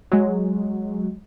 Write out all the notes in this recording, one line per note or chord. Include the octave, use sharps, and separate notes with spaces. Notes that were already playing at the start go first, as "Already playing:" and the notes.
F#3 G#3